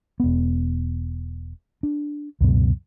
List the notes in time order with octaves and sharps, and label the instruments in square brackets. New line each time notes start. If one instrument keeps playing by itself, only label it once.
[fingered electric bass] E1 B3
D4
C#2 F#2 B2